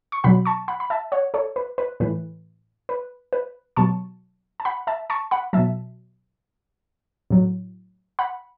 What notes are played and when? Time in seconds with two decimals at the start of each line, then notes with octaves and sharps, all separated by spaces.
0.12 C#6
0.24 B2 F#3 F#5 B5
0.45 A5 C#6
0.68 F#5 B5
0.80 B5
0.90 E5 A5
1.12 C#5 F#5
1.34 A4 C#5
1.56 B4
1.78 B4
2.00 A2 E3 B4
2.89 B4
3.33 B4
3.76 B2 F#3 A5 C#6
4.60 A5
4.65 F#5 B5
4.87 E5 A5
5.10 A5 C#6
5.31 F#5 B5
5.53 B2 F#3 E5 A5
7.30 A2 F#3
8.19 F#5 B5